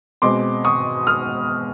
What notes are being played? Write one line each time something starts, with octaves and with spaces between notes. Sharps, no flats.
B2 G#3 C4 C6 D6
C#6 D#6
D#6 F6